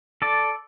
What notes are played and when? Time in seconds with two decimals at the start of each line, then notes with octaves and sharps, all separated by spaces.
0.22 A4 D5